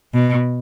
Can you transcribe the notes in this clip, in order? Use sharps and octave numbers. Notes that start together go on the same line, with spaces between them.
B2